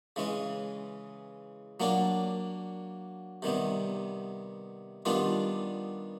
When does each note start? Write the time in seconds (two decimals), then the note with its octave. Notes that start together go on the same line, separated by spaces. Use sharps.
0.16 C#3 E3 G#3 C#4
1.80 F#3 A#3 D4 F#4
3.42 C3 D#3 G3 B3
5.05 D#3 G3 B3 D4 F4